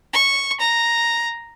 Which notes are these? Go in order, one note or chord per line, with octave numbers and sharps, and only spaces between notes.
C#6
A#5